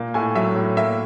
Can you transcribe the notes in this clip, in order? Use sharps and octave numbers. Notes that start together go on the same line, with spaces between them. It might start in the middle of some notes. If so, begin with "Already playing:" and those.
Already playing: A#2 A#3
A2 G#5
F#3 E5
A2
A#3 E5